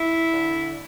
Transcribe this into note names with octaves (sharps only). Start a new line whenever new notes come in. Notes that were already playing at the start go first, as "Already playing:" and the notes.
Already playing: E4
D3